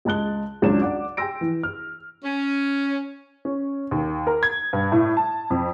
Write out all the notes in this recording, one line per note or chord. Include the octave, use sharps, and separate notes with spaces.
C#2 G#3 A5 F#6 G7
G#1 C#2 F#3 C#4 D4 E7
D5 F#5 D6
G5 G#5 C6 E6 A#6 D7
E3
F6
C#4
C#4
D#2
A#4
G#6
G2
A2
A5
F2